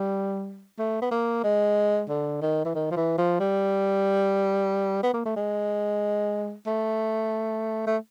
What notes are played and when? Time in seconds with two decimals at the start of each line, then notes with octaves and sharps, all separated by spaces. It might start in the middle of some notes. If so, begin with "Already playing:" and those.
Already playing: G3
0.79 A3
1.02 B3
1.11 A#3
1.44 G#3
2.09 D3
2.42 D#3
2.65 E3
2.75 D#3
2.91 F3
2.97 E3
3.18 F3
3.40 G3
5.03 B3
5.14 A#3
5.26 A3
5.36 G#3
6.67 A3
7.87 A3